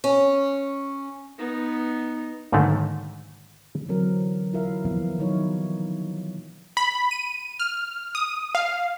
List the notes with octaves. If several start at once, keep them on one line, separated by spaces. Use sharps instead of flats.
C#4
B3 D#4
B1 G#2 D3 D#3 A3 A#3
D3 E3 F#3 C4 A#4
E4 F4 A#4 E5 F5
B2 E3 F3 A#3 B3 F5
D#3 E3 F#3 D#4 E4 C#5
B5
D#7
F6
D#6
F5